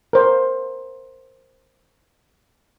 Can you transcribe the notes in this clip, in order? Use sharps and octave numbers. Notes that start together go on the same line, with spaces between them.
A#4 C5